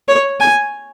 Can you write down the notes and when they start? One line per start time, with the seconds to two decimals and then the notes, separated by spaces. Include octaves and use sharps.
0.08 C#5
0.40 G#5